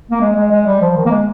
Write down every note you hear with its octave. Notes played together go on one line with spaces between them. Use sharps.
A#3
G#3
G#3
G#3
G3
F3
D#3
A#3
G#3